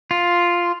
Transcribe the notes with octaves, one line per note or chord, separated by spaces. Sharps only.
F4